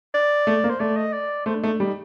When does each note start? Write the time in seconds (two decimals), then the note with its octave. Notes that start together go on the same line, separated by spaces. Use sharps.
0.14 D5
0.47 A3
0.64 A#3
0.70 C5
0.80 A3 D5
0.97 D#5
1.13 D5
1.46 A3 C5
1.55 D4
1.63 A3 D#4
1.72 D4
1.79 G3 D#4